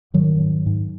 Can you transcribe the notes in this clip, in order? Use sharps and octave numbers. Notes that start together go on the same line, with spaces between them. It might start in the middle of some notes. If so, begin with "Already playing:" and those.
G#2 D#3 F#3
G#2
G#2